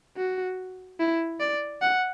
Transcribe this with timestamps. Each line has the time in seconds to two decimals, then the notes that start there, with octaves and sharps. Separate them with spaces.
0.17 F#4
1.00 E4
1.40 D5
1.82 F#5